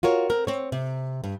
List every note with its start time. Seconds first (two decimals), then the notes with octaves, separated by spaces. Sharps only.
0.03 F4 F#4 A#4 C#5
0.30 C4 A#4
0.47 C4 C#5
0.72 C3
1.24 G2